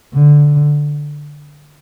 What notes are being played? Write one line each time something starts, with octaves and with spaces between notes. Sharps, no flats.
D3